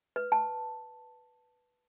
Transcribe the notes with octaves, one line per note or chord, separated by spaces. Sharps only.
B4
A5